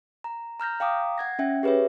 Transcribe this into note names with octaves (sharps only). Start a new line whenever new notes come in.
A#5
A#5 F6 G6 A#6
F5 G5 A#5 D6 D#6
F#5 G#6 A#6
C#4 E5 G5
G4 G#4 B4 C#5 E5